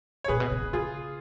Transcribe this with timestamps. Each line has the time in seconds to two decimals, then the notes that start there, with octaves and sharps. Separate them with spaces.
0.24 C#5
0.28 A#2 G#4 B4
0.40 B2
0.52 C#3
0.63 B2
0.73 C#3 F4 G#4